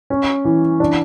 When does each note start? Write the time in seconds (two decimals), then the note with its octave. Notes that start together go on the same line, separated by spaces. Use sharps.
0.10 C#4
0.45 E3
0.80 D4